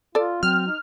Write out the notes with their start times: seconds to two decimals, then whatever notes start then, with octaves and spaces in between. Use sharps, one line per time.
0.15 F4 A4 D5
0.43 F#3 C4 F6
0.67 D#4